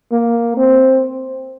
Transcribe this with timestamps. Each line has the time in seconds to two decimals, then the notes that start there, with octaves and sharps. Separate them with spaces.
0.12 A#3
0.57 C4